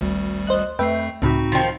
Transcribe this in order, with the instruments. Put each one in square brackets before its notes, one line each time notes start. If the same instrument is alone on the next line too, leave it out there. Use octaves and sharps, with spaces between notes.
[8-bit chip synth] G#1 D2 G3
[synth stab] C5 D#5 F#6
[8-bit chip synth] F2 A3 C7 [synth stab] B4 E5 G5
[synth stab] C#2 A2 B5 [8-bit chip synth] C4 D#4 F#4
[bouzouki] D#3 F3